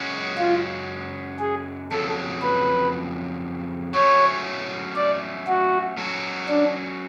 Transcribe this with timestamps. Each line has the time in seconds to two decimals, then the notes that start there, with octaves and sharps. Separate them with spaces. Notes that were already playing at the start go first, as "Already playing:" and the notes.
Already playing: F#2 C#3 G#3 C#4 F#4
0.38 F4
1.40 G#4
1.91 F2 C#3 F#3 A4
2.42 B4
3.94 F#3 A3 C#4 C#5
4.95 D5
5.47 F#4
5.97 F#3 C#4 F#4 A4
6.49 D4